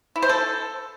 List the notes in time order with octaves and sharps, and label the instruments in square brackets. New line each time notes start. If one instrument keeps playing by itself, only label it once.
[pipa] E4
C5
A4